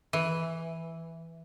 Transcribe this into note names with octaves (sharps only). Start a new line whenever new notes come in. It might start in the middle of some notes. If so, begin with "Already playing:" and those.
E3